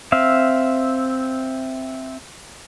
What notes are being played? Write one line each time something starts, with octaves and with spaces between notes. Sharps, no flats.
C4 E5 F5